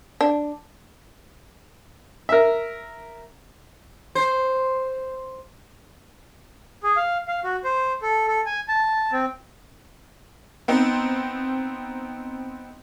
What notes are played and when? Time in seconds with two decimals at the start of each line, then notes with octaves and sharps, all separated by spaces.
0.21 D4
2.29 A#4 E5
4.15 C5
6.83 G#4
6.97 F5
7.28 F5
7.44 F#4
7.64 C5
8.02 A4
8.28 A4
8.46 G#5
8.68 A5
9.12 C4
10.68 B3 C4 D#4